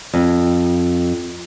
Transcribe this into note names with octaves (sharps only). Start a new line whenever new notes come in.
F2